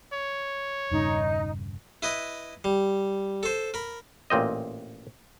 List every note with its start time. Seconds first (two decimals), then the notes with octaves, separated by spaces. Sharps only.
0.13 C#5
0.91 E1 G2 C#3 D#4
2.02 E4 B4 D#5
2.64 G3
3.43 A4 C5
3.74 A#4 B5
4.30 A1 A#2 C4 D#5